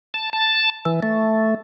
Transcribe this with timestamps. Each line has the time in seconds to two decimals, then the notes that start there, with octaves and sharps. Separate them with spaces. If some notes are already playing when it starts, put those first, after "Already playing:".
0.14 A5
0.33 A5
0.85 E3
1.03 A3